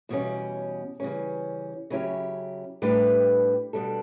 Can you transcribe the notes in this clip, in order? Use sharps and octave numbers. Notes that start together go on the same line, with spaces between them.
E2 B2 G3 C#4
C#3 E3 G3 C#4
C#3 F#3 C#4 E4 G4
A2 G3 D4 G4 B4
B2 G3 D4 A4